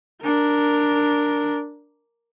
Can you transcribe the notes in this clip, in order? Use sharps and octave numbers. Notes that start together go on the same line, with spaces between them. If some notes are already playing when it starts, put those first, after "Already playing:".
D4 A#4